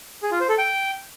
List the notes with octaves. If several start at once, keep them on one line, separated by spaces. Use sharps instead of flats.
G#4
F4
C5
A4
G5